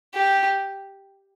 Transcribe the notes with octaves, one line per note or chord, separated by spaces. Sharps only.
G4